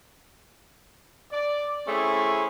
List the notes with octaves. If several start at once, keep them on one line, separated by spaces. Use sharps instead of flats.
D5
A3 C4 C#4 E4 G#4